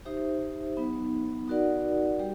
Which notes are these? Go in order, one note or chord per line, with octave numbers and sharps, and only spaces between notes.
D#4 G4 C5 E5
F#3 B3 D#4
D#4 F#4 A#4 D5 F#5
G3 G4